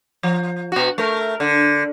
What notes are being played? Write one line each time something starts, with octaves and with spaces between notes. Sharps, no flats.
F3
B2 F#4
A3 A#4
D3